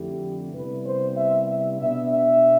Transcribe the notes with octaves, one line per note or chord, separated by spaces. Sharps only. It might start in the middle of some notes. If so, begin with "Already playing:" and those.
Already playing: F2 D3 A3 E4 G4
C3 G3 B3 E4 B4
C5
E5
E5
B2 B3 D4 E5
E5